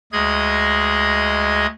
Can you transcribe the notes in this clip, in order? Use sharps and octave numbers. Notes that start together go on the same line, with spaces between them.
D2 G#3 G#4 D#5 G#6